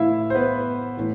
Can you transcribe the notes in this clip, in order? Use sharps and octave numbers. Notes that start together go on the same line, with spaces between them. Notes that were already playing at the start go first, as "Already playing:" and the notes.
Already playing: A2 E3 E4 E5 F5
C5
B3 B4
A2 E3